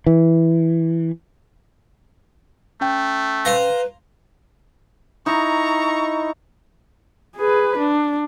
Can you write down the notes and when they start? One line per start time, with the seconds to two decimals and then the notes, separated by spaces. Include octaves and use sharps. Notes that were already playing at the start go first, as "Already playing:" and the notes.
0.07 E3
2.81 A3 C#4 G5
3.45 B4 C5 F5 A#5
5.26 D#4 E4 A#5 C#6
7.37 G#4 B4
7.78 D4